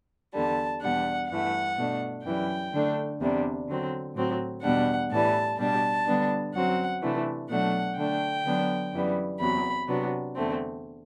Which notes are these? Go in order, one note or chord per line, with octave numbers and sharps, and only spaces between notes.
E2 D3 G3 A5
E2 B2 G3 D4 F#5
G2 E3 A3 F#5
B2 A3 D4
F#2 E3 G3 G5
D3 A3 D4
E2 C3 G3 D4
D3 F#3 C4
A2 F#3 C4
E2 B2 G3 D4 F#5
A2 E3 G3 A5
B2 G3 D4 A5
D3 G3 B3 D4
F#2 F#3 C4 F#5
C3 E3 A3 D4
B2 F#3 A3 D4 F#5
D3 A3 D4 G5
D3 F#3 B3 D4
F#2 E3 G3 B3
E2 C3 F#3 B5
C3 F#3 B3 D4
E2 D3 A3 C4